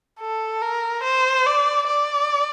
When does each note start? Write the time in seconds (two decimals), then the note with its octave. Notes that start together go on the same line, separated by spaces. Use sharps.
0.20 A4
0.62 A#4
1.03 C5
1.46 D5
1.87 D5